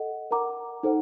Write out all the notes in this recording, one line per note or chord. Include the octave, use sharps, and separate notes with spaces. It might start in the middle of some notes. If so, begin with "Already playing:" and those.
Already playing: A4 D#5 F#5
A#4 F#5 A#5 D6
D#4 A4 C5 F#5